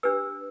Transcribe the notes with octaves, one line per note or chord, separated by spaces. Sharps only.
D4 G4 B4 E6